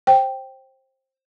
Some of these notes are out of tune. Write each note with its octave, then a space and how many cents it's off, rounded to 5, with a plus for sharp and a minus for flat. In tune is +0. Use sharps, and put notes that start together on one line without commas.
C5 +20 G5 +0